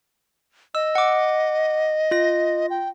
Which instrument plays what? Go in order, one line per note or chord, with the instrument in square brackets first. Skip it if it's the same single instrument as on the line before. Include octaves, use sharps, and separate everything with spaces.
[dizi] D#5 [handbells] E6
[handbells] F#5 D6
F4 A#6
[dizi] G5